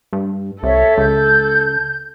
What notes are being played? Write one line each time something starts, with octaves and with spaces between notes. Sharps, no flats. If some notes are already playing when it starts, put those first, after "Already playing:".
G2
C2 A4 C#5 E5
C#2 G6